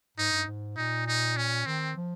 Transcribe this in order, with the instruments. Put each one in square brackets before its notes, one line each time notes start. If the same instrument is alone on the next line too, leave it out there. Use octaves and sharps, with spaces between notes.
[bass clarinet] G#2 [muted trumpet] D#4
[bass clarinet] G2
G#2
[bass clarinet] A#2 [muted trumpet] D#4
[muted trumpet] D#4
C#4
[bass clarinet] D#3 [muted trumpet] C4
[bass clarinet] F3